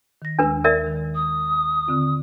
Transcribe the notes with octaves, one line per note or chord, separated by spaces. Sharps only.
D#3 A#6
D#2 G#3 D4 B4 E6
A#4 D5 E5
D#3
D#6
D3 C4 F4